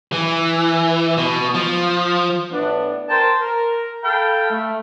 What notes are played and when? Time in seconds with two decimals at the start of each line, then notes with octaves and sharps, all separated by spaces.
0.12 E3
1.17 B2
1.54 F3
2.52 A2 B3 D4
3.09 A#4 C5 G5 A5 C6
3.40 A#4
4.03 A4 F5 G5 A5 B5
4.50 A3